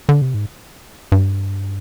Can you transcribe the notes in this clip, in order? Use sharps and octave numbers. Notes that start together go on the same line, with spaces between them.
D3
C3
G#2
G2